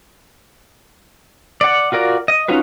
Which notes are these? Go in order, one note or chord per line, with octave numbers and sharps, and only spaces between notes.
D5 F#5
F4 F#4 A#4 D5
D#5
C#4 D#4 F4 F#4 B4